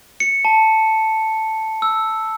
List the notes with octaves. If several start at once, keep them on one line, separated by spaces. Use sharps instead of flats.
C#7
A5
E6